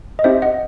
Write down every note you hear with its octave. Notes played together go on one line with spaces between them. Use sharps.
D#5
C4 D#4 G4 C5 E5
D#5 F#5